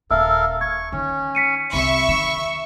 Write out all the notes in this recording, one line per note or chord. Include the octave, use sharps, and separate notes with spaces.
D#1 A4 A#4 E5 F5 E6
C#6 G#6
D#3 C#4
B6 C#7 D#7
C2 E5 B5 C#6
D#3